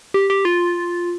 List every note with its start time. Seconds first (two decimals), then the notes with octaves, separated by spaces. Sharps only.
0.14 G4
0.30 G4
0.45 F4